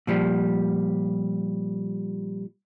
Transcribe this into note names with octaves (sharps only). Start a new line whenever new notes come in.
A#2 F3 G3